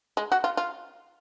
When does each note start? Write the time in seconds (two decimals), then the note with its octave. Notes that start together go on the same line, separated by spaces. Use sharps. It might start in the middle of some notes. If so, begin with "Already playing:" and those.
0.17 G#3
0.32 F#4
0.44 F4
0.57 F4